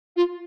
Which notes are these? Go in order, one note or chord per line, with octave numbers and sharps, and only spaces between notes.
F4